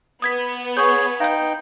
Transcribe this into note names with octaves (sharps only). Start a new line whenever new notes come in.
B3 D#6 G#6 B6
G#4 C#5 C#6 G6
D#4 F5 G5 G6